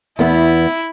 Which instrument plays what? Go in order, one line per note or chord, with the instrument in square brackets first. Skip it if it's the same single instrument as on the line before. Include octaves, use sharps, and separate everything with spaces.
[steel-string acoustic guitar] E2 B3 [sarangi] E4